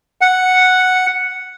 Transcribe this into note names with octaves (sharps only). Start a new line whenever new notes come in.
F#5